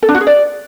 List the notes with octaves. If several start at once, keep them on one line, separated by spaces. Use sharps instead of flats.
A4
D4
F#4
G#4
D5